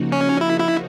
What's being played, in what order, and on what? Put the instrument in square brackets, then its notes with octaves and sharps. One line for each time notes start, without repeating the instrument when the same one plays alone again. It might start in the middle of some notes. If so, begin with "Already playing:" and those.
Already playing: [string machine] C#3 F3 A#3 D#4 F#4
[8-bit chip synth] C#4
E4
E4